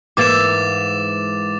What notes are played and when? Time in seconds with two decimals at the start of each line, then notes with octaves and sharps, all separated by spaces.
0.17 G#2 E3 A#3 D6 A6 E7